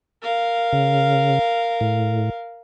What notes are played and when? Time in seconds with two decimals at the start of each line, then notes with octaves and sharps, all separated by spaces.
0.22 A#4 F5
0.73 C#3
1.81 A2